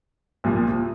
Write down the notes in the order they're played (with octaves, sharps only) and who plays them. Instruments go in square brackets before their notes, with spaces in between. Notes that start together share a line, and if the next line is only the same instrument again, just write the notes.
[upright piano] C2 A#2 F3